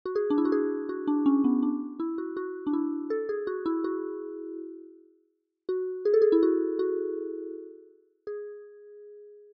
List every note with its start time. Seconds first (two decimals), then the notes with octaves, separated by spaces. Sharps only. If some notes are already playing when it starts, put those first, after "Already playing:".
0.06 F#4
0.15 G#4
0.30 D4
0.38 E4
0.45 F#4
0.52 G#4
0.89 F#4
1.07 D4
1.26 C#4
1.44 B3
1.63 D4
2.00 E4
2.18 F#4
2.37 F#4
2.67 D4
2.73 E4
3.10 A4
3.29 G#4
3.47 F#4
3.66 E4
3.84 F#4
5.69 F#4
6.05 G#4
6.14 A4
6.22 G#4
6.32 E4
6.43 F#4
6.79 F#4
8.27 G#4